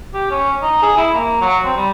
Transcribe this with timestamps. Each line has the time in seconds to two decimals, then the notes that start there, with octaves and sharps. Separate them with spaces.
0.14 G4
0.31 C#4
0.63 D#4
0.82 G#4
0.97 E4
1.14 A#3
1.41 F#3
1.65 C4
1.77 G3